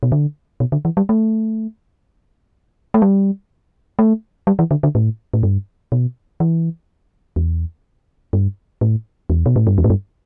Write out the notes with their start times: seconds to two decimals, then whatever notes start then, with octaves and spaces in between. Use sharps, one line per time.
0.03 B2
0.12 D3
0.60 B2
0.72 D3
0.85 E3
0.97 G3
1.09 A3
2.94 A3
3.02 G3
3.99 A3
4.47 G3
4.59 E3
4.71 D3
4.83 D3
4.95 A2
5.34 A2
5.43 G2
5.92 B2
6.40 E3
7.36 E2
8.33 G2
8.81 A2
9.30 E2
9.46 B2
9.56 A2
9.67 G2
9.78 E2
9.84 A2
9.90 G2